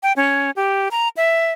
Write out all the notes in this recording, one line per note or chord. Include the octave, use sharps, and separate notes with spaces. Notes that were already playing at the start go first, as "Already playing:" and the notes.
G5
C#4
G4
A#5
E5